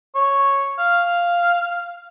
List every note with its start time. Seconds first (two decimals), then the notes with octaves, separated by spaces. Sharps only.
0.15 C#5
0.79 F5